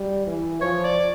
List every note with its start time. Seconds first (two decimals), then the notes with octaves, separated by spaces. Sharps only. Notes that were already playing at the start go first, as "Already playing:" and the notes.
Already playing: G3
0.27 E3
0.61 F3 C#5
0.85 D5